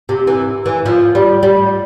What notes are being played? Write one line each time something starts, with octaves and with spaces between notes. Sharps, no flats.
C3
E3
E3
F3
G3
G3